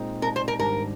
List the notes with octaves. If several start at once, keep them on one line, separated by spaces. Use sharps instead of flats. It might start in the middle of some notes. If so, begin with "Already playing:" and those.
Already playing: A#2 G#3 C4 D#4
A#4
C5
A#4
G#1 G#2 G3 D4 A#4